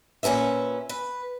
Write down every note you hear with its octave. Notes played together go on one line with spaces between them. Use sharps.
A#2 C#4 G#4 B4 E5
B4